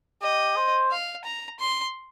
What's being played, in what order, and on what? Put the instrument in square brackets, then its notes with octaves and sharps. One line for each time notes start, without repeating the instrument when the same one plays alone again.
[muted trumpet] G4 [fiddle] D#5
[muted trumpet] C5
[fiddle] F5
A#5
C6